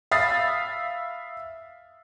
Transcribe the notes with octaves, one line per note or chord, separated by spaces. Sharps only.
E5 F5 B5 D#6 A6 C7